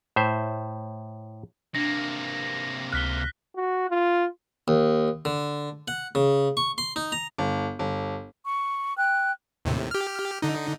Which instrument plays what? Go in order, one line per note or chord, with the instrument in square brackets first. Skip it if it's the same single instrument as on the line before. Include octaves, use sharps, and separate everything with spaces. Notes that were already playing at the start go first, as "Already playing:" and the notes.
[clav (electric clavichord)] A2 C5 E5
[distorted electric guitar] C3 A#3 [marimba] D4 [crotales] A#6
[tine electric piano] C#2 F6 [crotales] F#6 B6 G7
[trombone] F#4
F4
[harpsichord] D#2
D3
F#5
C#3
C#6
C6
D#4
A#5
[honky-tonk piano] G1
G1
[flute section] C#6
G5 F#6
[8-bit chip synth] D#2 A2 C3
G4 F6
D3 D#4